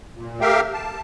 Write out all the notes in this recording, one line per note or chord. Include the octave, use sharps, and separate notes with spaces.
A#2
A3 G4 A#4 E5 F5 G5
A5